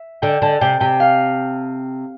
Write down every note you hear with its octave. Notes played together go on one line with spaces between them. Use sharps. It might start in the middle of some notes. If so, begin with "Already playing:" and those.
Already playing: E5
D3 G5
D3 A5
C3 G5
C3 G5
F5